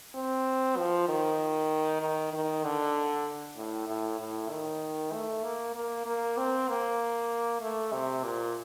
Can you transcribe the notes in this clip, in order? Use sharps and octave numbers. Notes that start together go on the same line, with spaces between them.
C4
F3
D#3
D#3
D#3
D3
A2
A2
A2
D#3
A3
A#3
A#3
A#3
C4
A#3
A3
C3
A#2